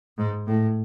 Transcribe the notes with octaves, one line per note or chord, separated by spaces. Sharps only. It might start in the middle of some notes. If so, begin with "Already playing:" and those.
G#2
A2